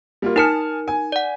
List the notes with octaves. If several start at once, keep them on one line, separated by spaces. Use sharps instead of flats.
G3 A#3 F4
D#4 A#4 G#5 A5 F6 C#7
G#5
D5 F#5